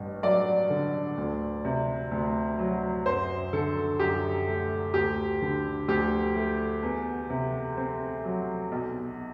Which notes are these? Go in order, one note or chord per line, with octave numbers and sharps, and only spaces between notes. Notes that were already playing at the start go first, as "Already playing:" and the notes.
Already playing: A1 G2
F#3 D5
D3
D2
C3
D2
F#3
F#2 C5
D3 A4
F#2 G4
A3
D2 G4
D3
D2 G4
A3
E2
C3
C4
F#3
B1